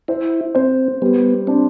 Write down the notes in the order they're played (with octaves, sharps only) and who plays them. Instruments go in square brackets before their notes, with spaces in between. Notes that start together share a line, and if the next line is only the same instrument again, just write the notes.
[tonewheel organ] E4 [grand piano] C5
[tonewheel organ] C4 [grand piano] C5
[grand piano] G3 [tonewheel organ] B3
[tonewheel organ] C4 [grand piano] D4